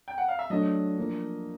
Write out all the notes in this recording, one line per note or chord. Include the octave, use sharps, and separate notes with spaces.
G5
F#5
F5
E5
F#3 A3 D4 D#5
F3 A#3 D4